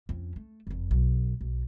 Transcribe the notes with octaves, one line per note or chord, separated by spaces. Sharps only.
F2 C#4
A3
F#1 F2
B1
B1